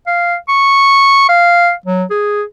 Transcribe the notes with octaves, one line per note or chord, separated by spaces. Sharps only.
F5
C#6
F5
F#3
G#4